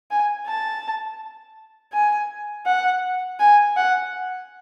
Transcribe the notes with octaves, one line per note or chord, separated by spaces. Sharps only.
G#5
A5
G#5
F#5
G#5
F#5